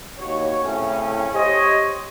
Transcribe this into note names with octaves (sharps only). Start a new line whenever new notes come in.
D#2 F#4 C#5
A2 C#3 C4 C#4
G4 C5 C#5 D#5